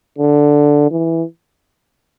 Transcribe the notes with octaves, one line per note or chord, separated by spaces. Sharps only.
D3
E3